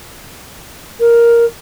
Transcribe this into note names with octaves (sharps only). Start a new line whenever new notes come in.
A#4